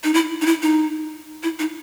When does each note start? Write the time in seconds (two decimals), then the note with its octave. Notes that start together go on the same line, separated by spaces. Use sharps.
0.04 D#4
0.14 E4
0.41 D#4
0.46 E4
0.63 D#4
1.43 E4
1.59 D#4